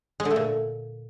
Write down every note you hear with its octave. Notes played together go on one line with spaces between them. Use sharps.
G#3
D3
A3
A#2